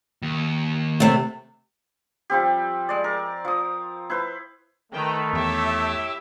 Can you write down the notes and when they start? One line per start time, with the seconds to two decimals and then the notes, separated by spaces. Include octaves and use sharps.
0.22 D#2
1.00 C3 A3
2.30 F3 G3 C4 G4
2.89 G#3 D5
3.04 A#4
3.45 F3 D#6
4.10 E4 B4 C5
4.92 D#3 A3 B4 G5
5.33 E2 E4 G4 C#5 E5